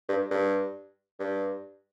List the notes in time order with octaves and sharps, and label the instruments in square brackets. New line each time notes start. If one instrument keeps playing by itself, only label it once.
[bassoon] G2
G2
G2